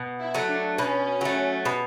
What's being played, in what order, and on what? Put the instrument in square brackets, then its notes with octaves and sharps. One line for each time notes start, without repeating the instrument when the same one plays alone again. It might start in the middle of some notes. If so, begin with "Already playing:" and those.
Already playing: [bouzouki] B2
[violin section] E4
[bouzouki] F#3 A3
[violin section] D4
[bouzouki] B2 [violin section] C#4
[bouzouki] F#3 A3
B2